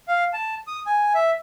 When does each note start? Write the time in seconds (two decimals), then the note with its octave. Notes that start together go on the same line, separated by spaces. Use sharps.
0.08 F5
0.33 A5
0.67 D#6
0.87 G#5
1.15 E5